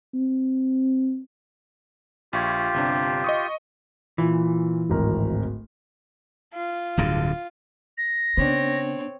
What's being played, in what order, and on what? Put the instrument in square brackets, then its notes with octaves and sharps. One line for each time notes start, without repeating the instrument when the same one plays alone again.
[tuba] C4
[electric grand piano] A#1 C#6 G#6 [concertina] F4 G4
[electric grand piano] G1 C3 D4
D#5 C#6 D#6
[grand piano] A#2 [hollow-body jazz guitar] E3
[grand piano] D1 G#1 A#4
[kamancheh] F4
[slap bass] D1 G2 D3
[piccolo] A#6
[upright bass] C#3 [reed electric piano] B3 D4 [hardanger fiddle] C4 C#5